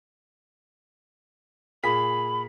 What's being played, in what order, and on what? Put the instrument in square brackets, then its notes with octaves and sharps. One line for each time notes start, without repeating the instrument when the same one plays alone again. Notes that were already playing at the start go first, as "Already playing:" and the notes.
[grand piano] A#2 G#4 B6 [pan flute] B5